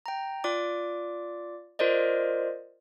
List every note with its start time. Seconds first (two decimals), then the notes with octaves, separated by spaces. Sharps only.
0.06 G5 A#5
0.44 F4 D5 D6
1.79 F4 A#4 C5 D5 D#5